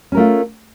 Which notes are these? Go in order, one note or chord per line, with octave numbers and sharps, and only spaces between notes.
A3 C#4 F4 A#4